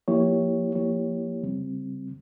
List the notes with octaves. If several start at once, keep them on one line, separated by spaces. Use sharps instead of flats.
F3 A#3 E4 G4 C#5
F3 A#3 E4 G4 C#5
C#3 G3 C4